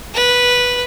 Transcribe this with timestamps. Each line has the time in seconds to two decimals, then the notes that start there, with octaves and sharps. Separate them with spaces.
0.14 B4